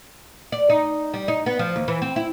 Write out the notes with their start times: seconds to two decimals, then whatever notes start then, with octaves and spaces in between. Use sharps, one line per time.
0.52 D5
0.70 D#4
1.14 G3
1.28 D#4
1.46 B3
1.59 F3
1.76 D#2
1.88 E3
2.02 C4
2.16 E4